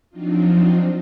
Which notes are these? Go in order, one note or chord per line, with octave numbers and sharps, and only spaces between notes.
F3 F#3 C4 D4 D#4 F4